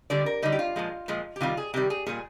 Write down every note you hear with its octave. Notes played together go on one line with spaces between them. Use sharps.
D3 G3 D5
A#4
D3 G3 D#4
G4
F4
A#2 F3 G#3
A#2 F3 G#3
G4
C3 D#3 G3 F4
G#4
C3 D#3 G3 G4
G#4
A#2 G3 G#4